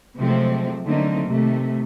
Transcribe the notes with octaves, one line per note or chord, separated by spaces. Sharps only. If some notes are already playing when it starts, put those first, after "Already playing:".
C3 F3 F#3 G#3 A3 C4
D3 F#3 A3 A#3 C4 D#4
C3 D#3 A3